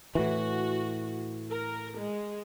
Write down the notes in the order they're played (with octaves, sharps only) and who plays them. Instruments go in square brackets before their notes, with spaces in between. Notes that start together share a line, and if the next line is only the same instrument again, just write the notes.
[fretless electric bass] A2 E3 [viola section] F#4
[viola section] A#4
G#3